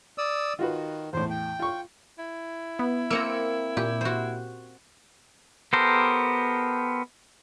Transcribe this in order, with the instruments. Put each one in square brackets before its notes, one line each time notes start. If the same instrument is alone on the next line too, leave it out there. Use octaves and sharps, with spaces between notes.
[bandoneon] D5 D#6 E6
[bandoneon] D#3 [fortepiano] F4 F#4 B4
[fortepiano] E2 A2 [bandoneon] C5
[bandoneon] G5
[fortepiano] F4 C#6
[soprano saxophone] E4
[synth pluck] B3
[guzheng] A#3 C4 A#5 [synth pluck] E6 C#7 D7
[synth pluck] A#2 [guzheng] G4
[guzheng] F#4 C5
[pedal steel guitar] B3 G4 A4 A#4 C5